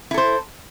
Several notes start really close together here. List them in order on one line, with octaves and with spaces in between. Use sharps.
E4 A4 C5